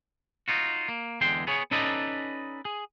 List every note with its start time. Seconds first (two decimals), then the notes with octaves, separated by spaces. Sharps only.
0.48 D#4 F4 F#4
0.88 A#3
1.21 E2 D3 G#3 G5 C6
1.47 B3 G#4 C#5
1.71 C#4 D#4 A4 B4 D5 D#5
2.65 G#4